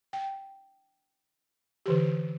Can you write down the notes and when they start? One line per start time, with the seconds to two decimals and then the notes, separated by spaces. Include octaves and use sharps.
0.13 G5
1.86 D3 E3 G4